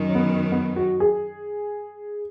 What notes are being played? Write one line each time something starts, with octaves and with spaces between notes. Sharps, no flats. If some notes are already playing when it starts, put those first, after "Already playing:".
Already playing: F#2 D#3 F#3
C#4
B3
B3
F#4
G#4